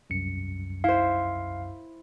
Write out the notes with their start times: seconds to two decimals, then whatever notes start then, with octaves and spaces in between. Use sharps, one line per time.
0.10 C2 F#2 C#7
0.84 E4 C5 F5